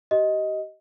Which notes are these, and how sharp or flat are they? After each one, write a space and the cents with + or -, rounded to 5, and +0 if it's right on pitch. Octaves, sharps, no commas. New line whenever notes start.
G4 -30 D#5 +10